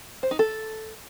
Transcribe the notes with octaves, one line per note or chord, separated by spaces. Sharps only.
C5
D#4
A4